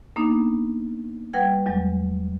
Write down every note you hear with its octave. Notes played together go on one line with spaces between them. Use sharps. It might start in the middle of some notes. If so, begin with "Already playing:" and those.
A#3 B3 D4 D#4
G3 B4 F#5 G5 G#6
E2 F#3 G#3